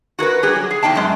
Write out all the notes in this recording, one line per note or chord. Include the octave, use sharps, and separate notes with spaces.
F#4 G#4 A#4 B4
G3 G4 G#4
F#3
G#4
E2 G#2 D#4 G5 A5
F#2 G#3